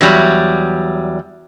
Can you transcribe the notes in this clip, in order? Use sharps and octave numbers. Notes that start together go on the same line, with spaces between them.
E2 F#3 G3